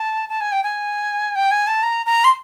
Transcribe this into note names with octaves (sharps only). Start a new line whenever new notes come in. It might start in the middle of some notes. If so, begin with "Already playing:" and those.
Already playing: A5
A5
G#5
G5
G#5
G5
G#5
A5
A#5
A#5
C6